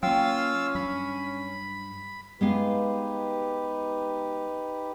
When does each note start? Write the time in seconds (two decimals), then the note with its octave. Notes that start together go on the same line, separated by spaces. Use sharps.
0.03 F#3 A#3 C#4 F4 F5 G5 E6
0.75 G2 F#3 B5
2.41 G#3 B3 D#4 G4 B4 F5